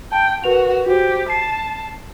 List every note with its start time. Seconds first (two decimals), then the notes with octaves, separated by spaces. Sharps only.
0.12 G5 A5
0.44 F#4 A#4 B4 F7
0.86 F#4 G4 C5
1.30 A5 C7